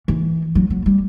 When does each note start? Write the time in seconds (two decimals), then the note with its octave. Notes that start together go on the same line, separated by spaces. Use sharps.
0.08 E3
0.55 F#3
0.70 F#3
0.86 G3